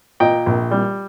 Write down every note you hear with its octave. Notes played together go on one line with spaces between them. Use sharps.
A#2 D#5 G5
A#1
G3